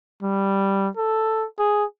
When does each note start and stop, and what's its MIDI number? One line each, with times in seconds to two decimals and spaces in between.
0.22 0.89 55
0.97 1.46 69
1.59 1.84 68